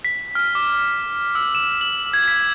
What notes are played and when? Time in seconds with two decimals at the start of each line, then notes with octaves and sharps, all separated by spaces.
0.05 B6
0.35 F6
0.55 D6
1.35 E6
1.55 E7
1.81 F#7
2.13 G#6
2.28 B6